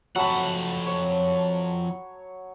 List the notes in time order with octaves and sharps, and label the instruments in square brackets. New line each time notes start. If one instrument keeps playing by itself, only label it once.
[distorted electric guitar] F2 F#5 [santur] F#3 A5 B5
[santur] C#5